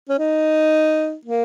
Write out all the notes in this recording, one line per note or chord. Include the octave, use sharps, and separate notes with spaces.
C#4
D#4
A#3